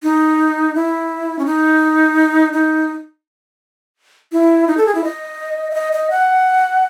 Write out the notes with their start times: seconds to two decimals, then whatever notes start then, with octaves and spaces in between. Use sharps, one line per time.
0.03 D#4
0.75 E4
1.39 C#4
1.46 D#4
2.53 D#4
4.32 E4
4.67 D#4
4.77 A4
4.86 G#4
4.95 E4
5.04 D#5
5.71 E5
5.74 D#5
5.93 D#5
6.10 F#5